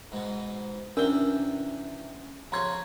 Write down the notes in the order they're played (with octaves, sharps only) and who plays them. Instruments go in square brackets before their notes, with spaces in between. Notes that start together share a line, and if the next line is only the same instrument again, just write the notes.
[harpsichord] G#2 B2
[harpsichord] E2 C3 G5 [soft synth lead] C#4 [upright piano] D4 G7 [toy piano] A#4
[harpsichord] F2 C#3 C#5 [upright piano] A#5 C6 G#6